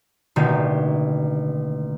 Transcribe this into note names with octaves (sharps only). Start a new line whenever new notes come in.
A1 B2 D3 D#3 A#3 G4